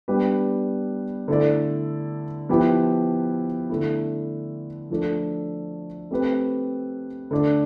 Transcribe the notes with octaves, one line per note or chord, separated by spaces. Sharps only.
G3 B3 D4 G4 B4
D3 A3 E4 A4 D5
F3 B3 E4 G4 B4
D3 A3 E4
F3 A3 D4 A4
A3 C4 G4 B4
D3 A3 D4